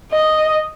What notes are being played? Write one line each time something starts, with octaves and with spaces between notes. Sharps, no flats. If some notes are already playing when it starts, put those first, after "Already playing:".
D#5